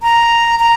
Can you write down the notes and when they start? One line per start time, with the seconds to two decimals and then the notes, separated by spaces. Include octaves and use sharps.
0.03 A#5
0.60 A#5